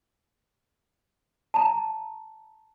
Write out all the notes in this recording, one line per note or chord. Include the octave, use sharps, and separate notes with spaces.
A5 A#5